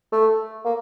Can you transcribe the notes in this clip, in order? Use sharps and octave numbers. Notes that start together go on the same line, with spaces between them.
A3
A#3